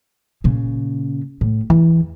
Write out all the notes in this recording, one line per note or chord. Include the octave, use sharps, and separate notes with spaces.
A#2 C#3
A2
E2 E3